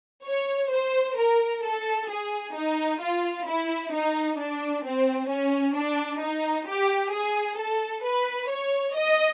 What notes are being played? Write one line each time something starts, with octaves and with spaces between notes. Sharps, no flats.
C#5
C5
A#4
A4
G#4
D#4
F4
E4
D#4
D4
C4
C#4
D4
D#4
G4
G#4
A4
B4
C#5
D#5